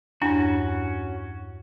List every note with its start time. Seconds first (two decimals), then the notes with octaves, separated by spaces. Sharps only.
0.22 E2 G2 C#4 D4 F#4